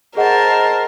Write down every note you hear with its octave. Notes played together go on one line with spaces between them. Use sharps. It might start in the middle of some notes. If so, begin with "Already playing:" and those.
G#4 A#4 C5 D#5 F#5 A5